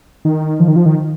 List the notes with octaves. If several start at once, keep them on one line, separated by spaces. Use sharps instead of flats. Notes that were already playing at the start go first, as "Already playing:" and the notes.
D#3
F3
D#3
F3
D#3